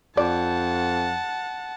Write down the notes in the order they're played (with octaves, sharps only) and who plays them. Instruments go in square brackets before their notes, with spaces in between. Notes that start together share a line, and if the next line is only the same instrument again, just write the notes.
[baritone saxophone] F2 [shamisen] D5 [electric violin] F#5 A5